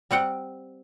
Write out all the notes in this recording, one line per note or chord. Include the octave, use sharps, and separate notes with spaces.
G3 C4 F#5 G5